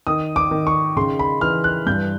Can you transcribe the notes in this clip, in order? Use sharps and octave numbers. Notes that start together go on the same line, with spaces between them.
D#3 D#6
D6
D#3
C#6
C#3 C6
B5
E3 F6
F#6
G2 G6